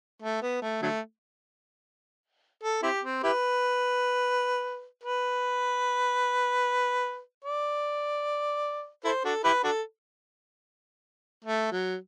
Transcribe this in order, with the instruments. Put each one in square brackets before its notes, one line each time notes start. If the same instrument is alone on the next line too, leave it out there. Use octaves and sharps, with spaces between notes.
[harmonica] A3
B3
A3
D3 F#3 A3
A4
C4 E4 G4
C4
E4 G4 B4
B4
D5
E4 A4 C5
D4 F#4 A4
E4 G4 B4
D4 F#4 A4
A3
F#3